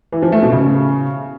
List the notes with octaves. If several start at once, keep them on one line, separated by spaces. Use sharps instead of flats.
E3
F3
A3
B2
C#3